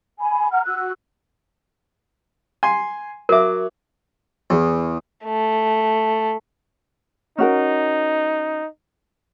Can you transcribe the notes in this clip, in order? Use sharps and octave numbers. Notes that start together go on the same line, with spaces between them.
G#5 B5
F#5 A#5 F6
F#4 E6 F#6
G#5 C6
F#3 A#4 E5 D6
E2
A3
C#4 D#4 F#4 A#4